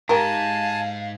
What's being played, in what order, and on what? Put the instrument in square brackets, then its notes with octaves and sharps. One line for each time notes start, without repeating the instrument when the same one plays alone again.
[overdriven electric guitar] G#2 [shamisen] G4 A#4 [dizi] F5 [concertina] G#5 A5